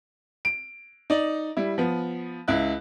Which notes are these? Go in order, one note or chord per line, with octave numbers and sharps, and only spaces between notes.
D7
D#4 D5
G3 E4
F3 B3
C#2 E4 F#6